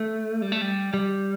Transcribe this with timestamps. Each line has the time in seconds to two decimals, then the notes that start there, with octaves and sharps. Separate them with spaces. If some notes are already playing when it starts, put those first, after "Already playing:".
Already playing: A3
0.42 G3
0.52 A3
0.61 G3
0.94 G3